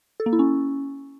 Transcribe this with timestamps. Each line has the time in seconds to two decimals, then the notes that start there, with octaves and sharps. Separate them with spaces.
0.20 A4
0.26 A#3
0.33 E4
0.39 C#4